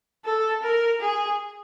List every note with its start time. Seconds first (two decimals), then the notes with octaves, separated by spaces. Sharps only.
0.25 A4
0.63 A#4
1.01 G#4